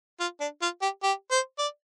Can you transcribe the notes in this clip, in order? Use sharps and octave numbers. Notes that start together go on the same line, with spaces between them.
F4
D4
F4
G4
G4
C5
D5